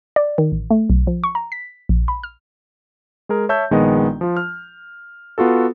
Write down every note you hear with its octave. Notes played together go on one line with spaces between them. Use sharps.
D5
D#3
A1
A3
B1
F3
C#6
A#5
B6
A#1
B5
F6
G#3 G#4 A#4
C#5 E5 A5 E6 G6
A#1 D#3 G#3 B3 D#5
F3 F4
F6
B3 F4 F#4 A4